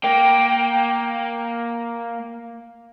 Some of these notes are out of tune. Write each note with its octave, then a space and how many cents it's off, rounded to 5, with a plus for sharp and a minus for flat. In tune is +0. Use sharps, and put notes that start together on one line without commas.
A#3 +5 G5 +0